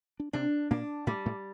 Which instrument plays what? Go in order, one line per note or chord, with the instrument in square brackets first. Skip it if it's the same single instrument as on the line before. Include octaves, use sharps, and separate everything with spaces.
[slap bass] D4
[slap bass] C3 C4 [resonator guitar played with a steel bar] D4
[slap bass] A#2 A#3 [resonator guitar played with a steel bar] D4
[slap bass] A2 A3 [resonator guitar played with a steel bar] G3
[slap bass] A2 A3